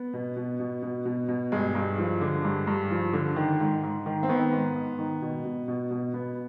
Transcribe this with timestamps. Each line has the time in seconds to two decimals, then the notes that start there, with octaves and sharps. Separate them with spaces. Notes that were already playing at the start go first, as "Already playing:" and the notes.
Already playing: B3
0.14 B2
0.36 B2
0.60 B2
0.83 B2
1.05 B2
1.29 B2
1.52 G2 G#3
1.75 G2
1.98 F3
2.21 D3
2.45 G2
2.67 G2
2.91 F3
3.13 D3
3.36 D#3
3.60 G#2
3.83 G#2
4.06 D#3
4.23 C4
4.29 D#3 B3
4.53 G#2
4.75 G#2
4.99 D#3
5.22 B2
5.45 B2
5.68 B2
5.91 B2
6.14 B2 B3